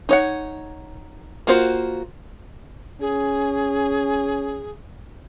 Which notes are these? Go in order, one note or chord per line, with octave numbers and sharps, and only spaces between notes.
D#4 C#5 F#5
A#3 F4 F#4 C5
C#4 G#4